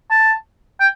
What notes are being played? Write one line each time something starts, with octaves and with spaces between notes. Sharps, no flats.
A5
G5